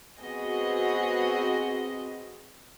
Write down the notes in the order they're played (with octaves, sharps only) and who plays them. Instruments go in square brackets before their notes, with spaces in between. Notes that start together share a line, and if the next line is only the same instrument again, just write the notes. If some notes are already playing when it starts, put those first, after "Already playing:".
[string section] B3 C4 F#4 G#4 D#5